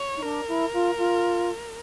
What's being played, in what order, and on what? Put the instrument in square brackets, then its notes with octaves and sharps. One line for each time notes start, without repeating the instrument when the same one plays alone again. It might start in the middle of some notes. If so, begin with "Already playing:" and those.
Already playing: [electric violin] C#5
[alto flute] D#4
[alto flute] D4 [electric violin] A#4
[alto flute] E4
F4
F4